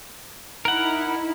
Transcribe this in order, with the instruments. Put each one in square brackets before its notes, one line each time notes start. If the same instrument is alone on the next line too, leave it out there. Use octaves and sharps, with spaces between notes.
[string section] D#4 E4 [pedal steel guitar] A#4 F#5